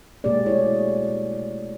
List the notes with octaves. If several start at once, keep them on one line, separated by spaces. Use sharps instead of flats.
B2 G#3 A#3 G4 G#4 D5
A3 E4 G#4 C#5